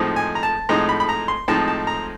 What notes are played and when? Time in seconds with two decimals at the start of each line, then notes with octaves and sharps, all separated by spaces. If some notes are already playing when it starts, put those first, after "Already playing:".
Already playing: A2 F3 G#3 C4 D#4
0.16 G#5
0.35 A#5
0.43 A5
0.69 A2 F3 G#3 C4 D#4 A#5
0.89 B5
1.00 B5
1.09 A#5
1.28 C6
1.48 A2 F3 G#3 C4 D#4 A5
1.68 A5
1.87 A#5